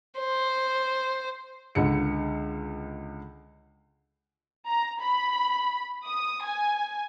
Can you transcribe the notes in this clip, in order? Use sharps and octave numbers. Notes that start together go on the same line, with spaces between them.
C5
C#2 D3 C#7
A#5
B5
D#6
G#5